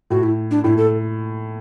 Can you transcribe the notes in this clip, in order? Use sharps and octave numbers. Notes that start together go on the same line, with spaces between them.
A2 F#4
E4
D4
A2 E4
A4